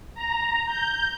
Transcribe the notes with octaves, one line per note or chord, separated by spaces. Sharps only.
A#5
G6